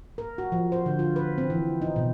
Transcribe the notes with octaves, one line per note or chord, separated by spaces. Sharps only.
A#4
F#4
F3
C5
D3
F4
B4
C4
E3
D#4
B2